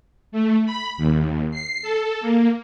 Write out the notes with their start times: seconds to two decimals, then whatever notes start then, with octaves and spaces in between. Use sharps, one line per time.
0.32 A3
0.66 B5
0.97 D#2
1.51 C7
1.82 A4
2.21 A#3